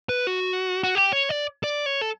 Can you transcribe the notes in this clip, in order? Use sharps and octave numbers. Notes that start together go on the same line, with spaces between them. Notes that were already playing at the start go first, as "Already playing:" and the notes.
B4
F#4
F#4
G4
C#5
D5
D5
C#5
A4